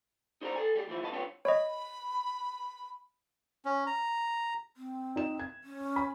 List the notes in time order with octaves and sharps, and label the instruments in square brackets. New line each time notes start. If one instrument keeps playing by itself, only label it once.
[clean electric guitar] D#4 G4 C5 D5 G5 A#5
A4 G#5
G3 G4 G#4
D2 E3 F3 E4
G2 B2 B3 D#5 A5
C4 D4 F4 G4 B4 C#5
[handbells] C#5 D#5 [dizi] B5
[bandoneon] C#4
A#5
[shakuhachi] C4
[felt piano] D#4 E7
G#6
[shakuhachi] C#4
[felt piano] G#5 B5